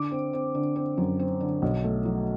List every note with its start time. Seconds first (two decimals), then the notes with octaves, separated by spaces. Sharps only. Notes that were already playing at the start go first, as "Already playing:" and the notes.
Already playing: D3 D6
0.11 C4
0.33 C4
0.55 D3
0.76 C4
0.98 F#2
1.19 C4
1.40 D3
1.62 B1
1.84 A3
2.05 F#3